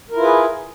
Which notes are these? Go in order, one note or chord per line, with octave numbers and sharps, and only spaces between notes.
E4 F4 G#4 A#4 B4